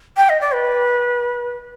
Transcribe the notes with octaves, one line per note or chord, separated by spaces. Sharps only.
G5
D#5
D5
B4